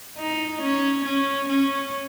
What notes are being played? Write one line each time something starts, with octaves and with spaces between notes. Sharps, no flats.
D#4
C#4
C#4
C#4